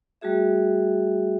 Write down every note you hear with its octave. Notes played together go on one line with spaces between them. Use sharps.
G3 A3 F#4 G#4 E5